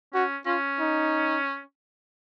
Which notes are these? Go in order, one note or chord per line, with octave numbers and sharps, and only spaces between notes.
C#4 F#4
C#4 F4
D#4